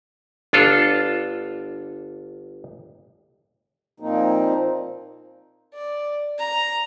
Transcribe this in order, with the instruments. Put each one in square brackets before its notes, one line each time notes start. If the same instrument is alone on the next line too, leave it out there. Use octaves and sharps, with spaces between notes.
[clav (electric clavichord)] G1 D4 F4 A4
[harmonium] A#2 F3 A#3 C4 D#4
[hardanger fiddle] D5
A#5